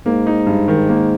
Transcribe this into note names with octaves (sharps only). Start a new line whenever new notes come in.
G#2 A#3
D#4
G2
D#3
A#3